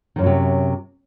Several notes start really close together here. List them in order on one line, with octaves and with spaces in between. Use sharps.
D#3 F#2 A2 F#3 C3